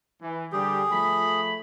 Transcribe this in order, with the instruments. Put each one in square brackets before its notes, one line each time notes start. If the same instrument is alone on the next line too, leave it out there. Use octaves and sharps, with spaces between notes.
[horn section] E3
[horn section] D3 G3 G4 [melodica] G#4
[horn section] F3 A3 B5